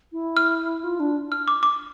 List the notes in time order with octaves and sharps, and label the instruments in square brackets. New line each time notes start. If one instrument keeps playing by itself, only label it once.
[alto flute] E4
[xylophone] F6
[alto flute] F4
D4
[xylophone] F6
D6
D6